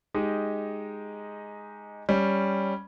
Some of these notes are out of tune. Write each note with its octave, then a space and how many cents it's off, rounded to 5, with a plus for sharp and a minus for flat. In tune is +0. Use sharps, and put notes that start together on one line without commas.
G#3 +0 D#4 +0 G4 -10
G3 +0 C#4 +0